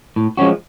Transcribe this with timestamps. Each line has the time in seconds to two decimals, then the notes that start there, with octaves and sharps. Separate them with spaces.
0.16 A2
0.37 F3 G#3 C#4 F#4